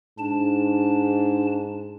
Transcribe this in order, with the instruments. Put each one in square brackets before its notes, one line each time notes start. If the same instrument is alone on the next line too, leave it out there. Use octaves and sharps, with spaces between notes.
[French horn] G#2 [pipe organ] D4 A5